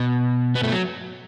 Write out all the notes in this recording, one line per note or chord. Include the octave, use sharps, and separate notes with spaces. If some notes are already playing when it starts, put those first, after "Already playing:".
Already playing: B2
B3
A3
F#3